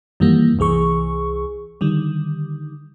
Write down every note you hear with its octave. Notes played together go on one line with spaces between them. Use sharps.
F#2 D#3 E3 G3 A#3
C2 E3 G#4 C#6
D3 D#3 G3